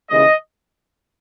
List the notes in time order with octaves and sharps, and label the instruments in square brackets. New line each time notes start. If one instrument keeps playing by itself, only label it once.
[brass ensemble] D#2 C#3 E3 G#3 D#5